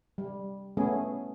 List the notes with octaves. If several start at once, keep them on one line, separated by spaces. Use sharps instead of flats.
G3
A3 B3 C#4 G#4